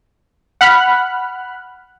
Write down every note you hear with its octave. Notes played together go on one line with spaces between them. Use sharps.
F#5 B5 F6 F#6